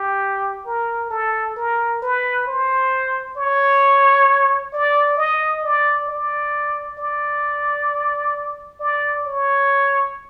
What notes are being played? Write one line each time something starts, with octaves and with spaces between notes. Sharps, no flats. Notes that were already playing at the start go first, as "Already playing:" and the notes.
Already playing: G4
A#4
A4
A#4
B4
C5
C#5
D5
D#5
D5
D5
D5
D5
C#5